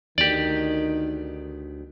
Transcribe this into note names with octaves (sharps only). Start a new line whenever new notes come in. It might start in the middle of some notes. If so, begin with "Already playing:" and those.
D2 D#3 G4 D5